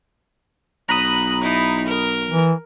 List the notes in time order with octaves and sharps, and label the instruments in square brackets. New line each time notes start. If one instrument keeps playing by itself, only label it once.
[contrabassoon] B1 [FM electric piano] A#5 B5 D#6 [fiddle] F#6
[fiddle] D#4 E4
A#4
[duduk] E3